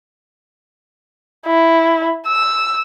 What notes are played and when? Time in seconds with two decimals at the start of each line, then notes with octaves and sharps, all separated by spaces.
1.47 E4
2.27 E6